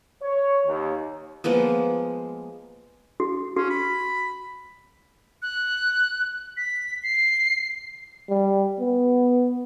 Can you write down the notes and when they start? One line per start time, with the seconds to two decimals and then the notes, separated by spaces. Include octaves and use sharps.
0.23 C#5
0.67 D#2
1.44 F3 G#3 A#3 B3
3.20 F#4
3.57 C#4 F#4
3.70 B5
5.42 F#6
6.57 B6
7.03 C7
8.29 G3
8.79 B3